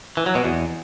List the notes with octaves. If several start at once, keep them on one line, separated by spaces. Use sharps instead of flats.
E3
F#3
B2
E2